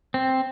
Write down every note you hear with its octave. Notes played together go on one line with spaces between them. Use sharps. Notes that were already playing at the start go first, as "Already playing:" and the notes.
C4